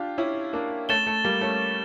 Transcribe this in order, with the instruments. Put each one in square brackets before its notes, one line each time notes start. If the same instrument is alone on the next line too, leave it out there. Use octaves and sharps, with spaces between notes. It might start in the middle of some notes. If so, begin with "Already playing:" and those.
Already playing: [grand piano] D4 F4 G4
C#4 E4
A#3 D4
[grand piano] A3 C#4 [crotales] A6 E7 G7
[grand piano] A3
G3 A#3
A3 C#4